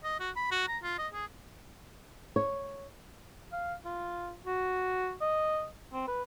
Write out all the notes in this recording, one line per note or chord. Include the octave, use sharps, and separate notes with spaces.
D#5
F#4
B5
F#4
A#5
F4
D#5
G#4
C#5
F5
F4
F#4
D#5
C4
B4